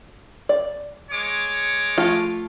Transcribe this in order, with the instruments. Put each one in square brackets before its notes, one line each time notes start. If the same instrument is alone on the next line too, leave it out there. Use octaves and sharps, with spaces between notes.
[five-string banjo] D5
[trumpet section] G#3 C#5 D6
[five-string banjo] F3 A3 F4